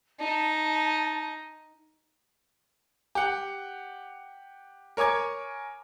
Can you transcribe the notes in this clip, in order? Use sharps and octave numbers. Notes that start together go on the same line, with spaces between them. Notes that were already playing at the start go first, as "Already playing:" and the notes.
D#4 A5
G4 F#5
A#4 C#5 G#5 D6 G#6